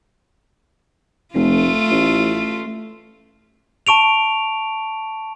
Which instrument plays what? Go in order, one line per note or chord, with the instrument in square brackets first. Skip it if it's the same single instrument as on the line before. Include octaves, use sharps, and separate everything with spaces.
[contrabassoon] F1 [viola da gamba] A3 F4
[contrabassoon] A1
[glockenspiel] A5 C#6 D7 F7